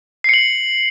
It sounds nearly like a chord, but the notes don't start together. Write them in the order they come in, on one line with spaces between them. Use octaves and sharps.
C7 C#7 F#7